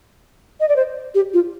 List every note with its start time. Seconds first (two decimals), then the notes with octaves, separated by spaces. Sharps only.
0.60 D#5
0.69 D5
0.76 C5
1.15 G4
1.34 F4